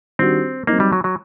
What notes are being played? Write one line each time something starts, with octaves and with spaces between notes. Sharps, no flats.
D#3 G3 C4 D4 F#4
F#3 A#3 C4 D#4
G3
F#3
F#3